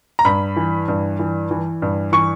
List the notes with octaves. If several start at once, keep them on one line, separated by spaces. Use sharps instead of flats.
A#5
G2 B5
E3
G2
E3
E3
G2
E3 C#6